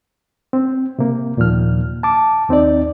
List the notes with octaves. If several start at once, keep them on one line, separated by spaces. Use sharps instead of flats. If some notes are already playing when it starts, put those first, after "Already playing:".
C4
C3 A#3
D#2 A#2 D#3 F3 F6
A5 D6
D#2 C4 D#4 D5